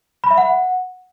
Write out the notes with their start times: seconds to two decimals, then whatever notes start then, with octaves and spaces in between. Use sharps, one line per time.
0.24 B5
0.31 E5
0.38 F#5